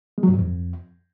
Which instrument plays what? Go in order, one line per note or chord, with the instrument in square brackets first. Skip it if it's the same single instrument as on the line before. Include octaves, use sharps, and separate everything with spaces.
[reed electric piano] G#3
F#3
G2
G#2
F2